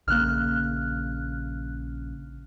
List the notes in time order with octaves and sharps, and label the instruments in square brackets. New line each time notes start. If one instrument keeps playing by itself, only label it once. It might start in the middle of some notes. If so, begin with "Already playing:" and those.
[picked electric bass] A#1 C#3 A#3 [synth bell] F6 F#6